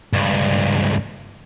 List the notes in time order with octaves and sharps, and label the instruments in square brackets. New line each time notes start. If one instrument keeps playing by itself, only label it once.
[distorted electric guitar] C#2 G2